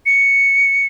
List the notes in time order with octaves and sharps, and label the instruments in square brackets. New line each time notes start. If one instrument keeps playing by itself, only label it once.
[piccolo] C#7